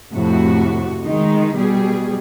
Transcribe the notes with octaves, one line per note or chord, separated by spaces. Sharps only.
F2 A2 C3 F#4
D#3 G#3 D#4
B2 G3 G#4